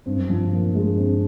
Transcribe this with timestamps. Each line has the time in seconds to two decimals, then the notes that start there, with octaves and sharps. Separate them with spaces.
0.06 G2 C4
0.18 F#2
0.28 G2 F3
0.53 A#2
0.75 G#3
0.98 C4